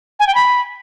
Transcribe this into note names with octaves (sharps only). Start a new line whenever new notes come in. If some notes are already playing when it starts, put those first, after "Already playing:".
G#5
G5
B5